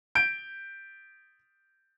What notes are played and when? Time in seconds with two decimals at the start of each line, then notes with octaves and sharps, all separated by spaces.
0.15 G6 D7